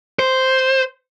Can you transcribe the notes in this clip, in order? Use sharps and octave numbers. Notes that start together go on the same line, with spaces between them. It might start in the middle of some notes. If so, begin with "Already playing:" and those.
C5